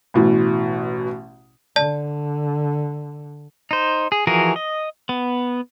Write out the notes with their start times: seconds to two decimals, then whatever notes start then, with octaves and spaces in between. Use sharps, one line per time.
0.14 A1 B2 E3
1.76 D3 D5 A5
3.71 D#4 C5
4.12 G#4
4.27 E3 F3 F#4 G#4 A#4
4.56 D#5
5.09 B3